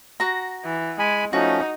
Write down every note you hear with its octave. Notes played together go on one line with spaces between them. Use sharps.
F#4 A#5
E3
G#3 G#5 B5
F3 A3 C#4 D#4 F#4